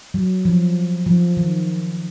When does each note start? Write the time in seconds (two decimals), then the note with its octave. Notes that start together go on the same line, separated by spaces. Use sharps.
0.14 F#3
0.45 F3
1.06 F3
1.37 D#3